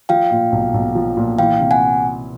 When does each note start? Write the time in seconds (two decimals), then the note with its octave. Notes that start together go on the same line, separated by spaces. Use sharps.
0.09 F3 F5 G5
0.31 A#2
0.52 B1
0.74 B1
0.95 F3
1.17 A#2
1.39 E3 F5 G5
1.60 C3
1.71 F#5 G#5